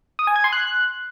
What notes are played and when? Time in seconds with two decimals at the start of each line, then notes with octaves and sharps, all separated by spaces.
0.19 D#6
0.27 G#5
0.36 G#6
0.44 C6
0.53 F#6